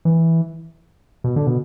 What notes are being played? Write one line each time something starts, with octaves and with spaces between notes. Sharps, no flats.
E3
B2
D3
B2